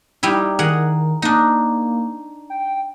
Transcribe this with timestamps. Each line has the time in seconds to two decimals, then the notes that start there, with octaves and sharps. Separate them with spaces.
0.23 G3 D#4 E4
0.59 D#3 G#4 A#4 F#5
1.22 A#3 D4 D#4
2.50 G5